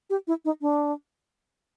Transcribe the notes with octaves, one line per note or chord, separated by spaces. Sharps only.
G4
E4
D#4
D4